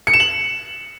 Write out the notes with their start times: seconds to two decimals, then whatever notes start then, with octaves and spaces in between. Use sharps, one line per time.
0.07 C#7
0.14 E7
0.20 F#7